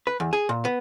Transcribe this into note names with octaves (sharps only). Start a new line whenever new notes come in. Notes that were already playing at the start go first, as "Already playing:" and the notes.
B4
E2
G#4
A#2
B3